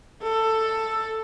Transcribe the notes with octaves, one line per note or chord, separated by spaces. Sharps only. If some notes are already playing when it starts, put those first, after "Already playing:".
A4